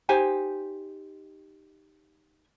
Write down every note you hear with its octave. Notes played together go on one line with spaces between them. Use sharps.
D#4 G4 C5 G#5